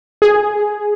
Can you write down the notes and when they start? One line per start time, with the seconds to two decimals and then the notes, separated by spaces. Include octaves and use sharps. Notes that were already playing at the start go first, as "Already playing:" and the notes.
0.22 G#4